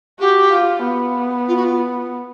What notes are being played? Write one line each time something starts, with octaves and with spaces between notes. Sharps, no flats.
F#4 G4
F4
B3
F4
F#4
F4